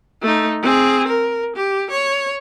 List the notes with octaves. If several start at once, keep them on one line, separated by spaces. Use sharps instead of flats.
A3 D#4
C4 G#4
A#4
G4
C#5